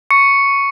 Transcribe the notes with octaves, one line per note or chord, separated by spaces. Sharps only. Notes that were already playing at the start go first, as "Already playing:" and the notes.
C#6 C#7